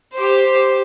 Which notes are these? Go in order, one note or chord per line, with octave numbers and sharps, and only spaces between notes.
G4 C5